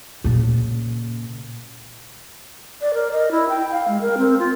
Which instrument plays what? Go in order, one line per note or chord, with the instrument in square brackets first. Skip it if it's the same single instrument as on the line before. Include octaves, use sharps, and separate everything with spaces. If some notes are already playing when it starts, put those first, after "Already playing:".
[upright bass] A#2 C#3
[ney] D5
A#4
D#5
E4
G5
F5
G#3
A#4
C4
F4